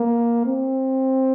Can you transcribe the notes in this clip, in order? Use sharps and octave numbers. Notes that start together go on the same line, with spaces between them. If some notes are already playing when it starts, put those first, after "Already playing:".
Already playing: A#3
C4